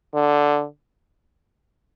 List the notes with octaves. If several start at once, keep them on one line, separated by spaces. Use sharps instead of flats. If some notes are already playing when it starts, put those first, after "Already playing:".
D3